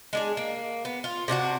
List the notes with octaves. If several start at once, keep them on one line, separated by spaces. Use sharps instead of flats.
G#3 D4 G#4
A#3
B3
F4
C3 D4 F4 F#4